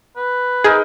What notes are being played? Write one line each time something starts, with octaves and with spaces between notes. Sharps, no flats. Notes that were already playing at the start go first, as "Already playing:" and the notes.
B4
D#4 G#4 A#4